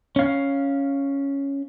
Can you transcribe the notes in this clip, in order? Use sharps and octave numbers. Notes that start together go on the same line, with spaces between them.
C#4 F5